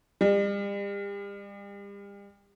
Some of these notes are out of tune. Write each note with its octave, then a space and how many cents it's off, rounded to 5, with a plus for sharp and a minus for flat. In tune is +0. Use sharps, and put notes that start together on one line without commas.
G3 +40